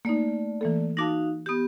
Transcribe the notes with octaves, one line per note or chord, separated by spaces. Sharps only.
A3 A#3 D#4 D5
E3 A#3 A4
D#4 F#4 F5 A5 D6 A#6
B3 G4 D#6 G6